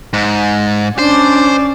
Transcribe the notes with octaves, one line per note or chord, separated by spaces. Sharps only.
G#2
C#4 D4 C5 D5